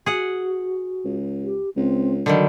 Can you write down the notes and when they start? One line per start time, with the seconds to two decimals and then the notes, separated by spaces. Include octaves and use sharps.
0.06 F#4 G#4 F#5
1.05 C#2
1.44 G4
1.76 C#2 C4
2.26 D3 D#3 F#3 G3